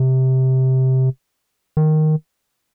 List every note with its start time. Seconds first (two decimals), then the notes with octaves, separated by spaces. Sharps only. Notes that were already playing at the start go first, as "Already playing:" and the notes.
Already playing: C3
1.77 D#3